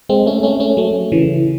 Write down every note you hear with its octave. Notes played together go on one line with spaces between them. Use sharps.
G#3 C4
A3 C#4
A3 C#4
A3 C#4
F#3 A3
C#3 E3